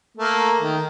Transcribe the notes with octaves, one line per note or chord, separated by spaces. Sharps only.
A3 A#3
D#3